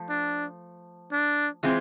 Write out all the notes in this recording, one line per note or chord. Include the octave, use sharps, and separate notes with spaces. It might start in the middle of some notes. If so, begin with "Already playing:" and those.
Already playing: F3 A3
D4
D4
E3 G#3 C4 F4 G#4